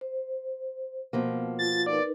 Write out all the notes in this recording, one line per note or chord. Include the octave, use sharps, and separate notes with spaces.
C5
B2 F3 A#3
F4 A6
D#4 A#4 B4 D5